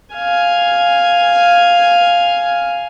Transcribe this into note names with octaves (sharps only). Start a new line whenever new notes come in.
F5 G#5